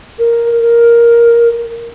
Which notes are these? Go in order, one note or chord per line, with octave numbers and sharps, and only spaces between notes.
A#4
A#4